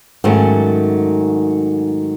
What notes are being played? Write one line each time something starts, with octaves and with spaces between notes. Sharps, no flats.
G#2 D#3 F#3 A3 C#4